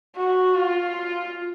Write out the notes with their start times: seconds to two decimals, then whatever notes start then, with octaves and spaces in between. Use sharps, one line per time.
0.16 F#4
0.55 F4